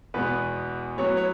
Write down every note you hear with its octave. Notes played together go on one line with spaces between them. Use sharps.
E2 B2 G#3 B3 B4
A2 F#3 B3 C#5
C#5